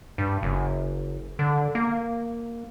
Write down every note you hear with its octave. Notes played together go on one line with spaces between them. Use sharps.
G2
F#1
D3
A#3